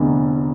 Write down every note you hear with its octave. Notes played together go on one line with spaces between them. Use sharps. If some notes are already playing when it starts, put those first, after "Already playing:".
Already playing: F1 E2 D3